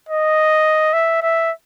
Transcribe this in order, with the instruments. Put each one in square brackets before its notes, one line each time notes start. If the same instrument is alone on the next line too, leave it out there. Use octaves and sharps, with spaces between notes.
[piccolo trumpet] D#5
E5
E5